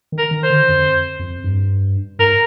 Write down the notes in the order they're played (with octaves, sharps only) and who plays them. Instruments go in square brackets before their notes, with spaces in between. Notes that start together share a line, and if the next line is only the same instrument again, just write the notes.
[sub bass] D#3
[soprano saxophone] A#4
[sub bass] D#3
[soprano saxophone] C5
[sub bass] D3
F2
F2
G2
[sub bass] G#2 [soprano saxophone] A#4